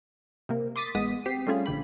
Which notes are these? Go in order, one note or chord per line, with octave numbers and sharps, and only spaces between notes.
C3 A#3
C6 D6 D#6 A6 B6
A1 G#3 B3 D#6 B6
C4 G4 B6 C7
G3 A3 C#4 F4 G#4
A#1 D3 G4 B5